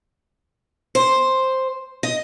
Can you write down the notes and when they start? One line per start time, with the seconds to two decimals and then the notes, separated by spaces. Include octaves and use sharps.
0.95 C5
2.03 D#5